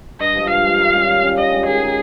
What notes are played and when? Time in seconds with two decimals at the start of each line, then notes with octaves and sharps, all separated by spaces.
0.20 G2 D#5
0.35 F3 G#3
0.50 G2 F5
0.64 F3 G#3
0.79 D#3
0.94 G3 C#4 F4
1.08 D#3
1.23 G3 C#4 F4
1.37 D#3 D#5
1.52 G#3 D#4 G4
1.66 D#3 G#4
1.81 G#3 D#4 G4